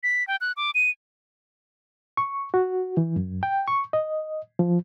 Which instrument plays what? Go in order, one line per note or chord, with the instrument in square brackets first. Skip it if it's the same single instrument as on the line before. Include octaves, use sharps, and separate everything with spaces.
[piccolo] B6
G5
F#6
D6
D#7
[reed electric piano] C#6
F#4
E3
F#2
G5
C#6
D#5
F3